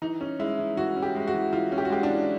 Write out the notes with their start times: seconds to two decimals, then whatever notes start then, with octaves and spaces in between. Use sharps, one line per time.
0.02 E3 D#4
0.21 C#4
0.40 G#3 E4
0.58 E3
0.77 E3 F#4
0.96 C#4
1.02 G4
1.15 G#3
1.28 F#4
1.34 E3
1.53 E3 F4
1.72 C#4
1.78 G4
1.85 F#4
1.90 G#3 G4
2.03 D4
2.09 E3